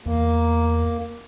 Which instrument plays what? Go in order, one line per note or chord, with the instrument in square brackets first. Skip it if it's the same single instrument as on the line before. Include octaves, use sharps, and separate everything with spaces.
[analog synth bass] E2 [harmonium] A#3